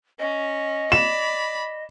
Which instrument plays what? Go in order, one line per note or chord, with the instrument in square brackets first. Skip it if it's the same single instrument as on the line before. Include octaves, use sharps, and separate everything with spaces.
[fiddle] C#4 [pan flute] D#5
[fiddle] D5 B5 [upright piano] E7